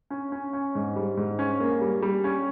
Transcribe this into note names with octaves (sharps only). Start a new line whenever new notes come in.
C#4
C#4
C#4
G#2
G3
G#2
C#4
A#3
G3
G3
C#4